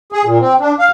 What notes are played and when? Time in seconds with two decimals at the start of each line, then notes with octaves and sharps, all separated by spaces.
0.12 G#4
0.24 A#2
0.39 C4
0.60 D4
0.79 F5